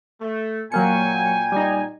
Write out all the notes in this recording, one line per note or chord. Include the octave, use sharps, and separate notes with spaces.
A3
A#2 F#3 A#3 G5 G#5 C#7
G3 D#4